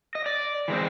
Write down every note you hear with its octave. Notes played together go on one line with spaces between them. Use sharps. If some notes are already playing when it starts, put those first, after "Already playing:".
D#5
D5
E3 G#3 C4